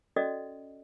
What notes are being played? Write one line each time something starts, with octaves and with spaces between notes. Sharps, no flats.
C#4 F#4 A4 D5 D#5